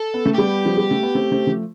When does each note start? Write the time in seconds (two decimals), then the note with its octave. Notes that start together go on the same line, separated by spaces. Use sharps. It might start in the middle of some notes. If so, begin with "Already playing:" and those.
Already playing: A4
0.14 B3
0.26 A3
0.34 G3 B3 G4
0.65 F3
0.77 G3
0.91 A3
1.03 B3
1.15 A3 C4
1.32 A3 C4
1.47 F3 A3